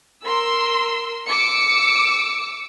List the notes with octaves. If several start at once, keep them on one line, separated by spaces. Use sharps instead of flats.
A#4 C6 E6
D6 E6 C#7